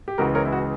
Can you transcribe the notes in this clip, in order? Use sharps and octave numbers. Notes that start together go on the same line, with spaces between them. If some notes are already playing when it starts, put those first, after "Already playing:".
G4
C#2 C#3 E3 F#4 A#4
A#4 C#5
E4
F#4